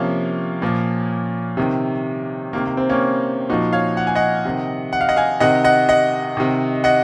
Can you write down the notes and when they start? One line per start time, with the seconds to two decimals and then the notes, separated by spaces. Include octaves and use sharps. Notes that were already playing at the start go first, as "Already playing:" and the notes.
Already playing: C3 F3 A#3 C#4
0.62 A#2 F3
1.57 C3 D#3
2.53 C3 D#3 A#3
2.65 A#3
2.77 C4
2.89 A#3 C#4
3.49 A#2 F3 D#4 F#4
3.73 C#5 F5
3.97 F#5
4.07 G#5
4.15 D#5 F#5
4.45 C3 D#3
4.93 F#5
5.01 F5
5.09 D#5 F#5
5.16 F5 G#5
5.40 C3 D#3 D#5 F#5
5.64 D#5 F#5
5.89 D#5 F#5
6.37 C3 D#3
6.84 D#5 F#5